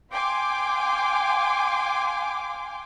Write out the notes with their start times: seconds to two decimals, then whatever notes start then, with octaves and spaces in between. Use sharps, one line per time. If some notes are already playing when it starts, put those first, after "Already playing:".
0.11 F5 G5 G#5 C6 D6